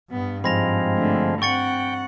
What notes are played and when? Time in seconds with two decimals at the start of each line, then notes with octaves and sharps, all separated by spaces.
0.11 G2 B3
0.44 G#2 F3 G#3 C4 B5 A#6 F7
0.95 D3 A3
1.42 C4 F#5 G5 C#6 A6 C#7